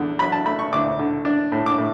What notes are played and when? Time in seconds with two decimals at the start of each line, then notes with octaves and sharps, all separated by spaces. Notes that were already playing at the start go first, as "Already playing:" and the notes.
Already playing: E2 D3
0.19 F#3 B5
0.32 A5
0.45 A3 B5
0.59 C#6
0.72 D2 D6
0.99 D3
1.25 D4
1.52 A2
1.66 D6
1.78 A2